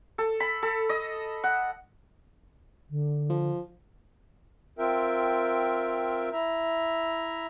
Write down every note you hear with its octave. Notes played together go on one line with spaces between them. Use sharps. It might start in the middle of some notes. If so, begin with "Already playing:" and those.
A4
B5
A4
D#5
F#5
D3
F3
C4 F4 A#4 E5 G5
E4 E5 A#5